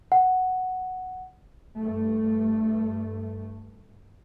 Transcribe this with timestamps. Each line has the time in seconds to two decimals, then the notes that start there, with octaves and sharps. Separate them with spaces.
0.12 F#5
1.81 G2 A3